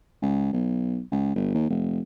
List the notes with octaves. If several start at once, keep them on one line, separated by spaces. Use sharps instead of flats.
C#2
B1
C#2
G1
D#2
F1